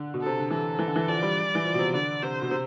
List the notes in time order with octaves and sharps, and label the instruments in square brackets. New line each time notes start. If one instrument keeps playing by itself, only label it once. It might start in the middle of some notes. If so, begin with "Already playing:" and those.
Already playing: [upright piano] D3
B2
[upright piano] C3 [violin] A4
[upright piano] D3
[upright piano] E3 [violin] A4
[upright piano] E3
D3
E3
[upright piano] F3 [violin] D5
[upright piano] G3
E3
F3
B2
C3
[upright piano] D3 [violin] D5
[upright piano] C3 [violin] C5
[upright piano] B2
C3